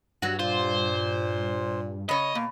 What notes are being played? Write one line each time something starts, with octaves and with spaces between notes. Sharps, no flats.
G2 F#3 F#4
A#2 F4 C5
C#3 C#5 D#5
B2 A#3